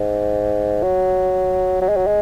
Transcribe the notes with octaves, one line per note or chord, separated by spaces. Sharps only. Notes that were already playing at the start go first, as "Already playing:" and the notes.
Already playing: G#2
F#3
F#3
G#3
F#3
G#3